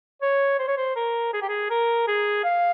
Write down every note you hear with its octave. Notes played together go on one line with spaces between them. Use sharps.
C#5
C5
C#5
C5
A#4
G#4
G4
G#4
A#4
G#4
F5